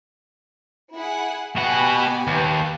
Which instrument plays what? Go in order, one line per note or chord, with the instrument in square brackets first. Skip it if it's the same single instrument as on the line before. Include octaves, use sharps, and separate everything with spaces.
[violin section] E4 G#4 F#5
[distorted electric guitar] B2 F#5 [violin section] G4 G#5 B5
[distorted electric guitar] D#2 [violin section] B4